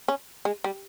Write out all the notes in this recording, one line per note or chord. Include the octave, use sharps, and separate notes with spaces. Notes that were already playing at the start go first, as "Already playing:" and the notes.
C#4
G#3
G3